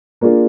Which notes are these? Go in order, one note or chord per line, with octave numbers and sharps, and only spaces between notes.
A#3 D4 F4 G#4